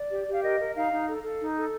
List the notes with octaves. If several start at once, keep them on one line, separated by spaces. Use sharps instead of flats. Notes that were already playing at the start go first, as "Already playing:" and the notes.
Already playing: D5
G4
G4
F5
A#4 D#5
A#4
D#4 F5
D#4
A4
A4
D#4
A4